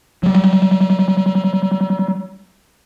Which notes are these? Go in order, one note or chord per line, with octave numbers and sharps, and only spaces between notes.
F#3 G3